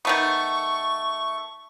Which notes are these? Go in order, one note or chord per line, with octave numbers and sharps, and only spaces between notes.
D#3 A3 B3 C#6